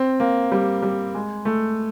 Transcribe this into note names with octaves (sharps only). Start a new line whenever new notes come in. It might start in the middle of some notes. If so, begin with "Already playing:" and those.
Already playing: C4
A#3
G3
G3
G#3
A3